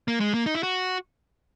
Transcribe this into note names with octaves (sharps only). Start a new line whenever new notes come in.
A#3
G#3
A#3
D#4
E4
F#4